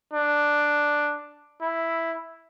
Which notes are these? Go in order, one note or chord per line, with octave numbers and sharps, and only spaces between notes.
D4
E4